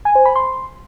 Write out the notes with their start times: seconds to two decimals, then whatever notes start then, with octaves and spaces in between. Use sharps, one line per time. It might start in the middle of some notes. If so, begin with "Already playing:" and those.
0.05 G#5
0.15 C5
0.25 B5
0.36 C6